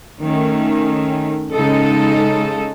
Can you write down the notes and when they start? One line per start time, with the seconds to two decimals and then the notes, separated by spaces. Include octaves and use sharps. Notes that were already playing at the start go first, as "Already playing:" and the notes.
0.21 D#3 A3 C#4
1.54 C#3 G#3 D#4 A4